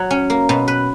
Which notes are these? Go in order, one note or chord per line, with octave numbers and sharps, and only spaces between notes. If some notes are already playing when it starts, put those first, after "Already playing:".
Already playing: F#3
C#4
A#3
B2
B4